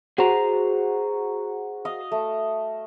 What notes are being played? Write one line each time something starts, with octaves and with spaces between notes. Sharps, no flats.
F#4 G#4 C5 A#5
D#5 F5
A3